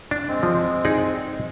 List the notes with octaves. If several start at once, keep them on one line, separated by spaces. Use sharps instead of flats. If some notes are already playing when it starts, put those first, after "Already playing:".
D4
G#3 C4
F3
D#4 G#4 D5
G#3